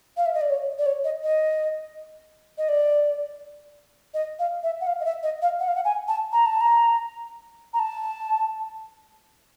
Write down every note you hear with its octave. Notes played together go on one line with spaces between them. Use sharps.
F5
E5
D#5
D5
C#5
D5
C#5
D#5
D#5
D#5
D5
D#5
F5
E5
F#5
F5
D#5
E5
D#5
F5
F#5
F5
F#5
G#5
A5
A#5
A5
A#5
A#5
A5